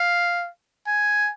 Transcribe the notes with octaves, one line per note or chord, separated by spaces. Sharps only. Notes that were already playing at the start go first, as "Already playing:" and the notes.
Already playing: F5
G#5